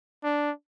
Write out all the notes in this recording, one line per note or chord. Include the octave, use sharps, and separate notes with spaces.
D4